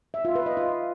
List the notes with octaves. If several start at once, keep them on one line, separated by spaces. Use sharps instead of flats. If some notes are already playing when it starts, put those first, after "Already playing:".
E5
F4
B4
D#5
F4